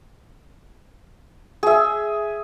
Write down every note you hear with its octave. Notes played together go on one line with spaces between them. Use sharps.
G#4 E5